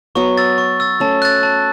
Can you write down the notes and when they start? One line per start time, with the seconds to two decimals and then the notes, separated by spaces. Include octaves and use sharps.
0.15 F#3 B3 C#6
0.38 E6 A6
0.58 C#6
0.80 E6 A6
1.00 A3 C#4 A5
1.22 F#6 A6
1.43 A5